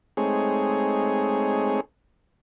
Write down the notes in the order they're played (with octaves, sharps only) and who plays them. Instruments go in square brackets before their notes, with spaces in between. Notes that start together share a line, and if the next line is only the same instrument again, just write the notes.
[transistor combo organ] G#3 A3 C4 D#4 G#4 C#5